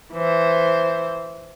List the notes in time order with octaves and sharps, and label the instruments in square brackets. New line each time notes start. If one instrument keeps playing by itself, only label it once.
[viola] E3 C5